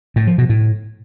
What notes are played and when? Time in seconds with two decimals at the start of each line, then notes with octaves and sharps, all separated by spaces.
0.16 A2
0.27 F3
0.38 B2
0.49 A2